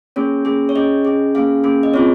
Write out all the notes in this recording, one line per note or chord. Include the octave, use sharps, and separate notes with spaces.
A#3 C#4 G#4 C#5
A#3 C#4 G#4
C#5
C#4 G#4 D#5
C#4 G#4
A#3 C#4 G#4 F5
A#3 C#4 G#4
D#5
C4 F4 G#4 C#5